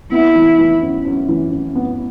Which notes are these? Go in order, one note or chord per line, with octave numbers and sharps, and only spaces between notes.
B3 E4
E3
E3
F#2
F#2
E3
F#2
B3